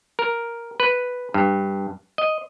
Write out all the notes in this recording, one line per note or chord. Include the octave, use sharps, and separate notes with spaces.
A#4
B4
G2
D#5